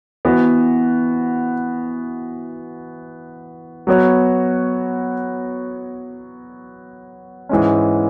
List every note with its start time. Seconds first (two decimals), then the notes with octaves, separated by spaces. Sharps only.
0.25 E3 B3 F#4 B4
3.87 F#3 B3 F#4 C#5
7.49 G#2 E3 G#3 C#4